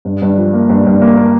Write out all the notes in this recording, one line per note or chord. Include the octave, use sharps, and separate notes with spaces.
G2
G2
F3
A#3
G2
G2
A#3
A#3